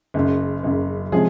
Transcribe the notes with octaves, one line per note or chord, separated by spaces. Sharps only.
F#1 F#2 C#3
F#1 F#2 C#3
C3 F3 G#3 C#4 G#4